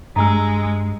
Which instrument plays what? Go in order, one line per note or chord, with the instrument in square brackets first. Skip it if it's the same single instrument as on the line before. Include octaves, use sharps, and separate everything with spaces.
[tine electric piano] G2 [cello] G#3 [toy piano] A#5 E6